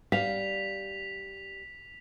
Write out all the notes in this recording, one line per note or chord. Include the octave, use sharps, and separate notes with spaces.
G3 D4 F5 B6 F7